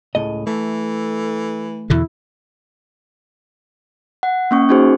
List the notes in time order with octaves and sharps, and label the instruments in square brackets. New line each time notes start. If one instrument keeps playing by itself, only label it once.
[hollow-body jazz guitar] C#2 A2 D#5
[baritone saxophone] E3 [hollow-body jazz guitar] A3
[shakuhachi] A4
[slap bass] E2 B2 D3 [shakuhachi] E4
[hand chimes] F#5
A#3 C#4 C#6
C#4 D#4 F#4 G#4 C5